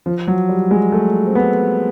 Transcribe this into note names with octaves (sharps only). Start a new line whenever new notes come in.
F3
F#3
G3
G#3
A3
C4
B3